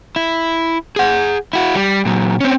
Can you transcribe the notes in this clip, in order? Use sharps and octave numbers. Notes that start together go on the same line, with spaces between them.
E4
G#4 F#5
E4 F#4
G3
A#2 F#3
C4 C#4